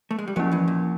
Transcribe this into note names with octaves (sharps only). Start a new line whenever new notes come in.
A3
G#3
G3
F#2 F3 F#3 A#3 C#4 E4
E2 E3
A#2